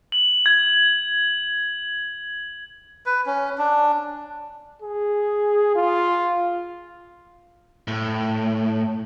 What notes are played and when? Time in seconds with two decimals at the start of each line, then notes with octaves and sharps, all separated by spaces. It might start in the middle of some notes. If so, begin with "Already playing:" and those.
0.12 F#7
0.46 G#6
3.06 B4
3.26 C#4
3.58 D4
4.82 G#4
5.76 F4
7.88 A2